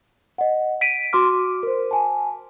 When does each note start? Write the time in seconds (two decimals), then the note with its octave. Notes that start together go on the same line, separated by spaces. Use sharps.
0.38 D#5 F#5
0.81 B6 D7 D#7
1.13 F#4 C6 D6 F6
1.63 A#4 C5
1.91 G#5 A5